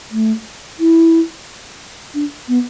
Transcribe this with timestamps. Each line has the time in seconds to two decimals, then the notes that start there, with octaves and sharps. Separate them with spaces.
0.12 A3
0.80 E4
2.14 D4
2.48 B3